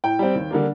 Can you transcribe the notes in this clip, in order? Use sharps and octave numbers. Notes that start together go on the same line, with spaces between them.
A2 G5
G3 C4
D#2
D3 G3 A#3 D4